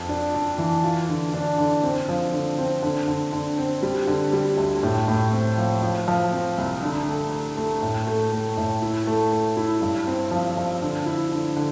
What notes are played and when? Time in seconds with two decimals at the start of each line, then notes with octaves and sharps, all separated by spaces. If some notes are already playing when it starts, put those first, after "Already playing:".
Already playing: F2
0.09 D4
0.34 D4
0.58 E3
0.83 F4
1.09 D3
1.34 D4
1.58 D3
1.83 C4
2.09 F3
2.34 D3
2.58 C4
2.83 D3
3.08 D3
3.33 D3
3.58 C4
3.82 G3
4.07 D3
4.33 G3
4.57 D2
4.83 A2
5.08 A2
5.32 C4
5.57 F3
5.82 F3
6.08 F3
6.33 C4
6.58 C2
6.83 D3
7.08 A3
7.32 D3
7.57 A3
7.82 A2
8.07 A3
8.32 A3
8.57 A2
8.82 E4
9.07 A3
9.32 A3
9.57 E4
9.81 G2
10.07 C4
10.31 F3
10.57 F3
10.82 D3
11.06 E4
11.32 D3
11.56 D3